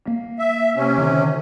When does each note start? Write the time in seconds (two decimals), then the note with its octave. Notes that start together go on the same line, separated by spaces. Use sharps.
0.08 A#3
0.39 E5
0.76 C3 C#4
0.98 D3 D#3